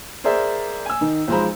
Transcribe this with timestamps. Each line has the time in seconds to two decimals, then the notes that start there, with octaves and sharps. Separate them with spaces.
0.24 G#4 A#4 C5 D5 E5
0.86 G#5 E6
1.01 D#3 D#4
1.28 B1 F3 G#3 C5 A#5 B5